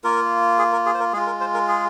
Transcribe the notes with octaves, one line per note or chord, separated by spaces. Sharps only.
A#3 F4 A#4
G#4
A#4
G#4
C5
A#4
G#3 F4 G#4
A#4
C5
A#4
G#4